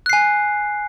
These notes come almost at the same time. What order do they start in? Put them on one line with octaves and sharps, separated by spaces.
F#6 C7 G#5